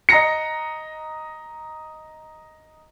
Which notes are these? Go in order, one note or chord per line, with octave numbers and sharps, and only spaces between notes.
D#5 A#5 A#6 C#7